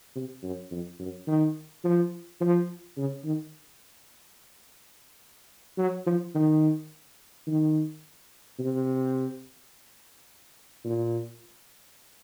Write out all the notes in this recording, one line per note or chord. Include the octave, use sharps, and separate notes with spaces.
C3
F#2
F2
F#2
D#3
F3
F3
C#3
D#3
F#3
F3
D#3
D#3
C3
A#2